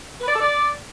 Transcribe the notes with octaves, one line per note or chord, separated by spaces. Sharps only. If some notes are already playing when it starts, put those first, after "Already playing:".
B4
D5
A4
D5